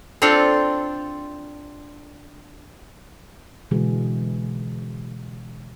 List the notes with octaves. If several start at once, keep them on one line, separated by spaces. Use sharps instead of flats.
C4 D4 F4 A4 F5 G5
B2 D3 E3 G#3 F#4 G#4